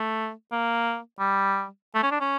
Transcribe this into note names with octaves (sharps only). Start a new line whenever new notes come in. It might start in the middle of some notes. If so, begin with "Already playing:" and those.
Already playing: A3
A#3
G3
A3
C#4
D4
C#4